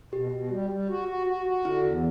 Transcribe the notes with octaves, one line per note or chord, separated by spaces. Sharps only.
B2 G4
B2
G3
G3
F#4
F#4
F#4
F#4
D3 E4
E2